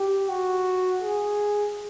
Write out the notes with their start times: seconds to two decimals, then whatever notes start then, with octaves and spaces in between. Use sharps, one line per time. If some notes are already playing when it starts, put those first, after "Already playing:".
Already playing: G4
0.29 F#4
1.02 G#4